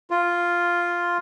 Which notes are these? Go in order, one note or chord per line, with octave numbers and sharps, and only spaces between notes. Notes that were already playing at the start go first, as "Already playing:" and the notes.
F4